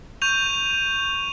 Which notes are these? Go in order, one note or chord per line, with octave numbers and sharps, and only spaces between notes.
C#6 G6 D#7 F7